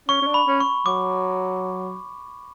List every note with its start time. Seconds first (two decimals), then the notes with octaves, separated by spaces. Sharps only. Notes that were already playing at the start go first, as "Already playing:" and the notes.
0.08 C#4 C#6
0.22 C#4
0.27 D4
0.34 B5
0.47 C#4
0.60 C#6
0.86 F#3 D6